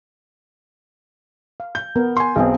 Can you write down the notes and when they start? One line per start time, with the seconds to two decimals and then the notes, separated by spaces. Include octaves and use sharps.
1.60 F5
1.75 G6
1.96 B3 A#4
2.17 G#5 C6
2.36 B1 B3 C4 D#4 G#4